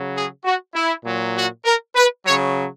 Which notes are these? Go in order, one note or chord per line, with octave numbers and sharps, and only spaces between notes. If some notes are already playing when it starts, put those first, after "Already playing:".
Already playing: C#3 F#3
G#4
F#4
E4
A#2 F#3
F#4
A#4
B4
C#3 F#3 C#5